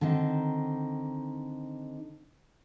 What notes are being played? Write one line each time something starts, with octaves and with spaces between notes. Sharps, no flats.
D3 D#3 C4 D#4